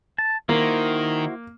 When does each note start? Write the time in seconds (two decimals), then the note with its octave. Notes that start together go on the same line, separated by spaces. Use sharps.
0.18 A5
0.49 D#3 A#3 E4 F#4 C5